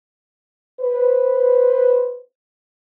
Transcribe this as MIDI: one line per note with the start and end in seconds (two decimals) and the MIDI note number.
0.80 2.20 71
0.80 2.20 72